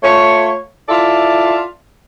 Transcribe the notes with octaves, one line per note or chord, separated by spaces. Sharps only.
A3 F4 C#5
E4 F4 A4 D5 E5